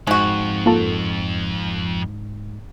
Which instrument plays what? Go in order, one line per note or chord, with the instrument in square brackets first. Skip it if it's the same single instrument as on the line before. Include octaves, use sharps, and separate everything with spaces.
[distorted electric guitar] F2 [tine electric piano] G#2 [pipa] G#3 F#4
[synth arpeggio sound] A#3 F4 A4